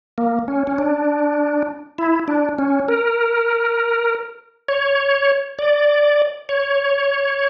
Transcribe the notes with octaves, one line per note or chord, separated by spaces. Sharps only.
A#3
C#4
C#4
D4
E4
D4
C#4
A#4
C#5
D5
C#5